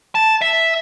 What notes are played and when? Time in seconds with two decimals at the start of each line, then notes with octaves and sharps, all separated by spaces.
0.15 A5
0.42 E5